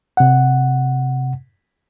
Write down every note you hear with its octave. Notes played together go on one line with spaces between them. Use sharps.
C3 F#5